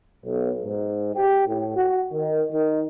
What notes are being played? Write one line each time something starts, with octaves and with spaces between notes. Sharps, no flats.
B1
G#2
G4
A2
F#4
D#3
D#3